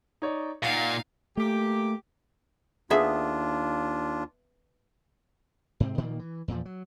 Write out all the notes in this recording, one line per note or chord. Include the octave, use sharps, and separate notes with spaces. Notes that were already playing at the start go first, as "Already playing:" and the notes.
D#4 C#5 D5
A#2 D#4 F5 F#5 A6 C7
A#2 A3 A#3 G4
D#2 B3 D4 F4 G#4 E5
G#2 C3 C4
A#2 D#3 F3 A#3
E3
E2 A#2 F3
F#3